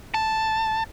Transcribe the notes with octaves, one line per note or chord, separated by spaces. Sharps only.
A5